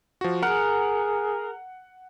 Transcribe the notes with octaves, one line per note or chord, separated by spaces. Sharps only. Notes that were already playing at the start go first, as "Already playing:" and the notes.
F3 F#4
G#4 A#4 F#5